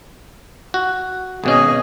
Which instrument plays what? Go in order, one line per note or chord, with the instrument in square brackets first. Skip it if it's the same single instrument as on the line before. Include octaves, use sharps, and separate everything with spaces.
[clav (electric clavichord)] F#4
[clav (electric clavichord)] G#1 B2 C#4 [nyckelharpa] G#4 D#5